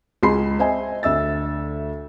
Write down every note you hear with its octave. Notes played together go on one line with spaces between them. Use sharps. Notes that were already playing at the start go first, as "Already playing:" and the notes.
C#2 G#4 B5 C6 C7
C5 D#5 E5 G#5
D2 E5 E6 A6